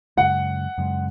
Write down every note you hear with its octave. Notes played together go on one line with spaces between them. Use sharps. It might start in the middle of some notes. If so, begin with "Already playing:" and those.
F#2 C#3 G#3 F#5
F#2 C#3 G#3